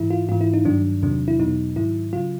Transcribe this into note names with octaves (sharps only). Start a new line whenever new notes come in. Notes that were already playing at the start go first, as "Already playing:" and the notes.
Already playing: G#2 E3 E4
F4
G#2 E3 F4
E4
D#4
G2 D#3 F#3 D4
E2 C3 D#3 F#3 D4
E4
E2 B2 F#3 D#4
G#2 D#3 F#3 E4
C#3 F#3 F4